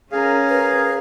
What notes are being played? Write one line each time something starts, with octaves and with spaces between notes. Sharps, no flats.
C#4 G#4 A#4 F5
B4